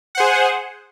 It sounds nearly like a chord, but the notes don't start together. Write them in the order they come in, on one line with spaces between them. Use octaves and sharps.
F#5 C5 G#4